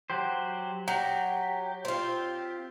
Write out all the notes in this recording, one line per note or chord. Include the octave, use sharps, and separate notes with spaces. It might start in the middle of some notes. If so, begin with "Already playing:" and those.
F#3 G4 C5
F#3 G4
C4 F4